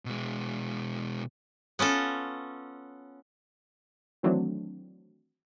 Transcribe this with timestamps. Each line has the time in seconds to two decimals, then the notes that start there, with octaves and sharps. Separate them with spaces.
0.05 B2 G#3
1.79 B3 C#4 F4 A4
4.23 D#3 E3 F#3 A3 C4 D4